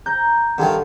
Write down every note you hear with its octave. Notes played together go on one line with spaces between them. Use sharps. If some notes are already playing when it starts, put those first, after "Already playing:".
A#5 G6
G2 D3 D#3